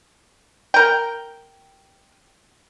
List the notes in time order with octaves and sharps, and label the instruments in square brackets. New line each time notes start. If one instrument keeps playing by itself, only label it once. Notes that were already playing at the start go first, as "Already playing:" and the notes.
[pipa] A#4 G5